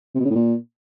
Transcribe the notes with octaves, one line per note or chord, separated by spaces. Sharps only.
C3
B2
C#3
A2
A#2